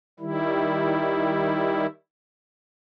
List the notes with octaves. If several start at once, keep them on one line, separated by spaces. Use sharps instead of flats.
D#3 G3 E4